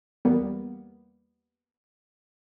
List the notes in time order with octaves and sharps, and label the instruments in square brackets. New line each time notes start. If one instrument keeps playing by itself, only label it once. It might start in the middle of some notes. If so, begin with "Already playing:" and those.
[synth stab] E2 G3 A#3 B3